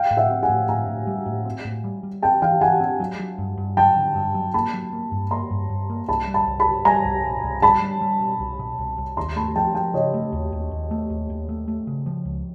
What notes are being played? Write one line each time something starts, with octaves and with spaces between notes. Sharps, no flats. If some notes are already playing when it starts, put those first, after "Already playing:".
Already playing: F5 G5
A2
E5 F#5
C4
F#5 G#5
A2
A2 G#5 A#5
A2
G3
A2
C4
A2
G3
G3
C4 G5 A5
E3 F5 G5
E3 F#5 G#5
C4
F#3
F#3
G2
G2
F#3 G5 A5
D3
G2
F#3
A#3 A5 B5
F#3
A#3
G2
A#3 A#5 C6
G2
G2
A#3
C2 A5 B5
G3
A5 B5
C2
A5 B5
C2
G3 G#5 A#5
C2
B2
C2
G3 A5 B5
G3
G3
B2
C2
B2
C2
C2
D#2 A#5 C6
A3 A5 B5
F3 G5 A5
F3 G5 A5
C#3 C#5 D#5
A3
D#2
D#2
D#2
A3
D#2
D#2
A3
A3
C#3
F3
C#2